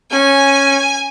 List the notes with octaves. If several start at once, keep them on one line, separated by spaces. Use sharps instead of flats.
C#4 G#5